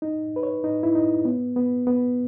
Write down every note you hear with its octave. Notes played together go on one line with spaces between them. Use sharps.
D#4
B4
C#5
D#4
E4
D#4
B3
B3
B3